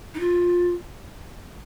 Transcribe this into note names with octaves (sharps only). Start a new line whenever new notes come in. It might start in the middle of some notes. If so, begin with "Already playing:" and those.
D#4
F4